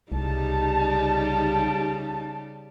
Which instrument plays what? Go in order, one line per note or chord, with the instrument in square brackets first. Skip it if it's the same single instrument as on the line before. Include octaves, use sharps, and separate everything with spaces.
[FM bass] C2 [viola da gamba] C#3 G3 G4 [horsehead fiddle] D#4 A5